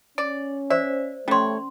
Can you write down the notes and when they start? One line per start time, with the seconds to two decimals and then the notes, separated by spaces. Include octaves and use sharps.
0.18 C#4 D5
0.70 C5 D5 E5
1.28 G3 A3 C#4 C#5 C6